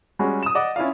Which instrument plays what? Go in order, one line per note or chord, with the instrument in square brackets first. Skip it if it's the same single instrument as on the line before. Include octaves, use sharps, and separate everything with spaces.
[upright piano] G3 G#3 C#4 F#4
D#6 E7
D5 D#5 F#5 D6
C#4 E4 F4 D5 F5